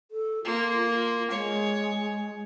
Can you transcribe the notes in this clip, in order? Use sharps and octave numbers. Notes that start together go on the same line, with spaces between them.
A4
A#3 F4
F4
G#3 C#5